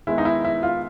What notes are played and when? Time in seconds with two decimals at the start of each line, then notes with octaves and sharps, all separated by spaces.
0.07 D#3 G#3 B3 E4
0.18 D#4
0.25 E4
0.45 E4
0.63 F4